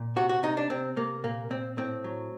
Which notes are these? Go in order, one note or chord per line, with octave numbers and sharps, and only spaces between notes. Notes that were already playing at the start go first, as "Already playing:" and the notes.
Already playing: A#2
C3 F#4
F#4
C3 D#4
D4
C3 C4
C3 A#3
A#2 A#3
A#2 C4
A2 C4
F#3